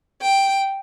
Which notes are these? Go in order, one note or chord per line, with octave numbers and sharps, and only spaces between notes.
G5